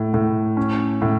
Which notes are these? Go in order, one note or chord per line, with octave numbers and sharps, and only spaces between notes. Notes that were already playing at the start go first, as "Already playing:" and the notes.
Already playing: A2
A2
C#4
A2